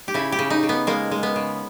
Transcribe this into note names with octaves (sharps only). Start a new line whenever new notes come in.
G4
C#3 E4
G4
C#3
D#4
C#3
B3
G#3 A#3
G#3
B3
C#3